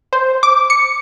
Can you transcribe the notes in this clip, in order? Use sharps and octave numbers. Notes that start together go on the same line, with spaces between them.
C5
D6
C#7